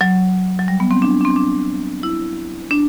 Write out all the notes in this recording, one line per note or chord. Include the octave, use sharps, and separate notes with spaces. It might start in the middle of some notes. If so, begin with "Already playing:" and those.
F#3
F#3
G3
B3
C4
D4
D4
C4
D4
E4
D4